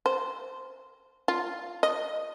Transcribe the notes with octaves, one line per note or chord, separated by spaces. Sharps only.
C5
F4
D#5